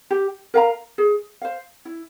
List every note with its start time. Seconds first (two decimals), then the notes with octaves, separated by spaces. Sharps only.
0.11 G4
0.54 A#4 F5 A#5
0.98 G#4
1.42 C5 F5
1.85 E4